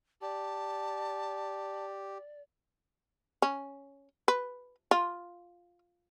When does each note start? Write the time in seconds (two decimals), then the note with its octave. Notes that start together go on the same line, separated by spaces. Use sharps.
0.22 G4 D5 A5
3.42 C#4
4.28 B4
4.91 F4